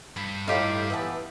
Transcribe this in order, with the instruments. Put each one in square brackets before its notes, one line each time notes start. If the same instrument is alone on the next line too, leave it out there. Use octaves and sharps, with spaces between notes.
[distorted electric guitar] G2 [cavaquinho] B5
[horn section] A2 [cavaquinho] D#4 F5 [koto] F4 G4
[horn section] E3 B3 [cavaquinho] B4 E5 A5